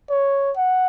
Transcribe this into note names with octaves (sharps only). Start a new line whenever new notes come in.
C#5
F#5